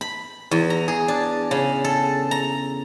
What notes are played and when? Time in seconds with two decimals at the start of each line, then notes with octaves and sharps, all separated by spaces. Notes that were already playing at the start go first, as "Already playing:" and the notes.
0.01 B5
0.51 E2
0.70 A#5
0.88 G#4
1.08 D4
1.51 C#3
1.84 A4
2.31 A#5